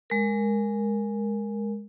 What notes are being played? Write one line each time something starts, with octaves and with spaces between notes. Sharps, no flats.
G#3 A#4